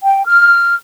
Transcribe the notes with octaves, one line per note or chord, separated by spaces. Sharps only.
G5
F6